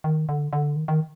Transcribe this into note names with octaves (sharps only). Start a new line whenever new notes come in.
D#3
D3
D3
D#3
D#3